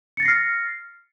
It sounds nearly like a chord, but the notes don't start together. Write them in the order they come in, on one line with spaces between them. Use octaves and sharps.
C#7 A6 A#6 C7 F6